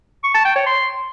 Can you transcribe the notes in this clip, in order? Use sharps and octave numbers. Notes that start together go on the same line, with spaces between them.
C#6
A5
G5
C#5
C6